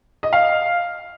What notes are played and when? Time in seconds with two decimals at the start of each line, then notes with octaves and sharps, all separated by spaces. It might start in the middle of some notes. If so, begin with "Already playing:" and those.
0.23 D#5
0.33 F5